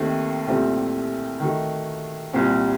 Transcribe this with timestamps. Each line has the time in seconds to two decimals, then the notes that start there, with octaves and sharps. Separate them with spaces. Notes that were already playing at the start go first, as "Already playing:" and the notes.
Already playing: D#2 D#3 A3 C4
0.47 C2 A#2 A3 C4 G4
1.40 D#3 A3 D#4 F#4
2.33 C2 A#2 G3 C4